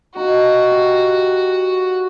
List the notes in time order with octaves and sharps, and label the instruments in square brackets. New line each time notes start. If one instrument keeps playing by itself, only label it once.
[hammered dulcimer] D#4 F4 [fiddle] F#4
[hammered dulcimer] G4